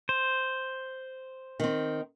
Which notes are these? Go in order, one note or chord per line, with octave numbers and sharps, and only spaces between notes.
C5
D#3 C4